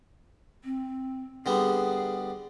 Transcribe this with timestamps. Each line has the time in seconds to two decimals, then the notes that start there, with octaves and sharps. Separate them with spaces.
0.64 C4
1.46 D3 G3 B3 G#4